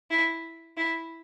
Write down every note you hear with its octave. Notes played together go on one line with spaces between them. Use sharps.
E4
E4